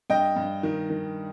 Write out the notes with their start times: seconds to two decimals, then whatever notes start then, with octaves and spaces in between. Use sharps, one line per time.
0.10 G2 D#5 G5
0.36 G2
0.63 D#3
0.90 D#3